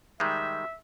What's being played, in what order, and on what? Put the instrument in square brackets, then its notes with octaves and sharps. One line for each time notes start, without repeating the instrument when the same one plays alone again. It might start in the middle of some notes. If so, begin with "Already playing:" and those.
[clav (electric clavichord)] D#3 G3 G#3 [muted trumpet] E5